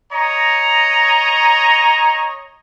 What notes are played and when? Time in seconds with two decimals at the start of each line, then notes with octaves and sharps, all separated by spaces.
0.12 C#5 D#5 A#5